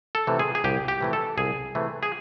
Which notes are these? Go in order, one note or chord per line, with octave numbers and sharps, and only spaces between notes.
A4
C3 E3 A3
G#4
G#4
C2 G4
G4
C3 E3 A3
A4
C2 G#4
C3 E3 A3
G#4